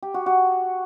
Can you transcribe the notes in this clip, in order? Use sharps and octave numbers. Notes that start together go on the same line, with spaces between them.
G4
F#4
F#4